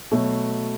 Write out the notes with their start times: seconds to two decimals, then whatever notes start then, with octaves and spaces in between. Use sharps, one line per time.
0.11 B2 F#3 A3